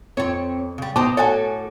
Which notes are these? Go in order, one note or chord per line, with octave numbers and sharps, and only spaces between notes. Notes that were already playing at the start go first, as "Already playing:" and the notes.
F2 C4 C#5
C#3 G3
B2 D#4 C5 D#5 A5 D6
A2 F#4 A4 C#5 G#5